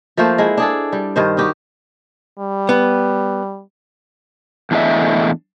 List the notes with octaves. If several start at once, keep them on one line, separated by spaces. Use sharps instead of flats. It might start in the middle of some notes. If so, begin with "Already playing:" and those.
F3 A3 A#3 C5
G#3 E4
D4 G#4 A4
G3
G2 D#3 C5
D#4 F#4 G4 B4
G3
B3
E2 A2 D4 G#4 D#5 E5